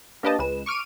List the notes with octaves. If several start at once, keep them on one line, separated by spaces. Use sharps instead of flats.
A#3 D4 G4 B4 D#5 A5
C#2 G#3 B4 E7
C#6 D6 F6 D7 D#7